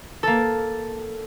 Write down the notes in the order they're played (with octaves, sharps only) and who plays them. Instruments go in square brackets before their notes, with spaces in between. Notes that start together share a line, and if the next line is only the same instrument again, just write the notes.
[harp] A#3 A4